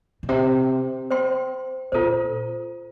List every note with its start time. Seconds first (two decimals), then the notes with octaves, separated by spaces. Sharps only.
0.23 A#2
0.29 C3 C5 G5 C6
1.10 C5 G5 C6
1.92 A#2 F4 A4 C5